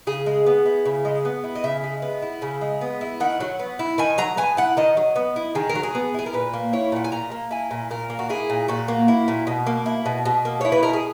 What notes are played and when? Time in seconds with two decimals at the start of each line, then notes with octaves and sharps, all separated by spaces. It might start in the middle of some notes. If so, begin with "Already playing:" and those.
0.07 C#3 G#4
0.26 G#3
0.46 B3
0.66 E4
0.85 C#3
1.05 G#3
1.25 B3
1.44 E4
1.55 D#5
1.64 C#3 E5
1.84 G#3
2.02 B3
2.22 E4
2.42 C#3
2.61 G#3
2.81 B3
3.01 E4
3.20 D#3 F#5
3.40 F#3
3.59 B3
3.79 E4
3.98 D#3 G#5
4.18 F#3 A#5
4.37 B3 G#5
4.57 E4 F#5
4.77 D#3 D#5
4.97 F#3
5.16 B3
5.36 E4
5.55 D#3 G#4
5.69 A#4
5.75 F#3
5.83 G#4
5.95 B3
6.14 E4 G#4
6.26 A#4
6.33 A#2 B4
6.53 A#3
6.73 E4 C#5
6.92 A#2 F#5
7.04 G#5
7.12 A#2 A#5
7.32 A#3
7.51 E4 G#5
7.71 A#2
7.91 A#2 A#4
8.10 A#3
8.19 F#4
8.29 E4 G#4
8.50 A#2
8.68 A#2 F#4
8.88 A#3
9.08 E4
9.28 A#2
9.47 B2
9.67 A#3
9.86 E4
10.06 B2
10.25 B2
10.45 A#3
10.61 E4 C#5
10.72 B4
10.83 B2 A#4
10.93 G#4